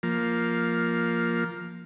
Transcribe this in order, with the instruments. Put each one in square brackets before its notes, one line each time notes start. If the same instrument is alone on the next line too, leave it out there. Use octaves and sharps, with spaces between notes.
[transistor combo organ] F3 A#3